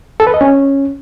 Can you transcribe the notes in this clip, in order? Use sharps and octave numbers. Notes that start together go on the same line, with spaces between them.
A4
B4
D#5
C#4